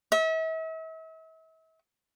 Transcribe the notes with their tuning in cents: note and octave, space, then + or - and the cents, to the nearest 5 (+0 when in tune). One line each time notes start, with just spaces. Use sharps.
E5 -40